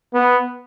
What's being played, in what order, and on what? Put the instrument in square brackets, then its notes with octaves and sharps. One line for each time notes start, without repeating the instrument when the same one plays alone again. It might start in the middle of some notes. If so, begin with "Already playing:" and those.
[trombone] B3